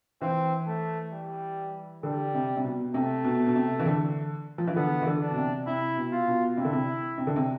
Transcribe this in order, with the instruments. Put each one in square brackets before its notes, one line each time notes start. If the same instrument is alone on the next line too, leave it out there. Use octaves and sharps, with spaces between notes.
[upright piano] E3 [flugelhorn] C4
[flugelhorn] A3
G3
[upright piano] D3 [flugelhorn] G3
[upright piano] C3
C3
B2
[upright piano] C3 [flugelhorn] A3
[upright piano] B2
B2
C3
E3
D3
F3
E3
[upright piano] D3 [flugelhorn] B3
[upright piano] E3
D3
[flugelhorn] D4
[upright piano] B2
C3
[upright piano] C3 [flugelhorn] E4
[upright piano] B2
[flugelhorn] F4
[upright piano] B2
[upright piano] C3 [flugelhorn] E4
[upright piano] D3
C3
C3
D3
C3